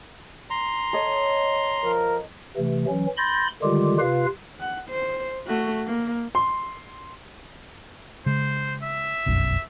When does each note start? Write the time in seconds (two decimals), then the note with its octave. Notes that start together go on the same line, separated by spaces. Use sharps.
0.50 A#5 C6
0.93 A4 C#5 D#5
1.83 F3 A#4
2.57 C3 E3 A3
2.88 E3 F#3 C#4
3.17 B5 C6 G6 A6 A#6
3.63 D3 D#3 G3 G#3 F4 G4
3.99 C3 F4 B4 F5
4.60 F#5
4.89 C5
5.47 A3 F#4
5.86 A#3
6.35 C6
8.26 C#3 G#3 C5
8.82 E5
9.26 F1 B1 F#2